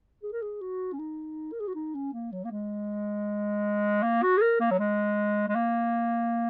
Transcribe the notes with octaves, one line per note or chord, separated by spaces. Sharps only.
G#4
A#4
G#4
F#4
C#4
D#4
A#4
G#4
F#4
D#4
C#4
A#3
F#3
A#3
G#3
A#3
F#4
G#4
A#4
A#3
F#3
G#3
G#3
A#3